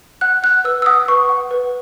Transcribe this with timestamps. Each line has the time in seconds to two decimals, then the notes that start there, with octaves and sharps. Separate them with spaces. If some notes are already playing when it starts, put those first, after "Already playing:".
0.21 F#5 F#6
0.43 F#5 F#6
0.64 B4 E6
0.82 E6
0.86 F#5 D#6
1.08 B4 C#6
1.29 F#5
1.51 B4